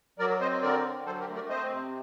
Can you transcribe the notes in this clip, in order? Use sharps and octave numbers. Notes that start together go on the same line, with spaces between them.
F#3 A#4 D5
C4 C5 D#5
D3 A#4 D5
D3
F#3 A4 C5
G4 A#4
A3
A#4 D5
C4 C5 D#5
C3